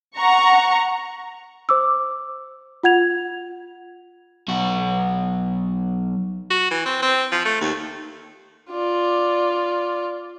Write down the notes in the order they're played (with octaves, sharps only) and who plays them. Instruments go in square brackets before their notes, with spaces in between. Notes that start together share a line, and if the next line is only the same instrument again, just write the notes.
[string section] F#5 A#5 C#6
[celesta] C5 D6 E6
F4 F#5 G#6 F7
[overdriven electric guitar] B1 F#4
[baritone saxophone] F#4
E3
C4
C4
F3
A3
D#2
[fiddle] F4 D5